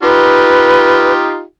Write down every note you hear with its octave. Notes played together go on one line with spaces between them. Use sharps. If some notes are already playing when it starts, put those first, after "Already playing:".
D#4 F4 G4 B4